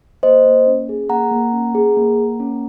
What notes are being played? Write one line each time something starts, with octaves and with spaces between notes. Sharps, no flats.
A#3 C5 D#5
A#3
C#4
G#4
A#3 F#5 A#5
A#3
C#4
G#4
A#3
A#3
C#4